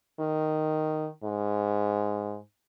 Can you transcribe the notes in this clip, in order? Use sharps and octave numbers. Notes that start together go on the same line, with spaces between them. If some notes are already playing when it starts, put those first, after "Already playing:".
D#3
G#2